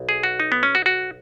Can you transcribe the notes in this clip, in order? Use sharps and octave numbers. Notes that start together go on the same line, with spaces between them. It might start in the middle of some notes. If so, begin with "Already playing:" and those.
Already playing: B1
G#4
F#4
D#4
B3
C#4
F#4
F#4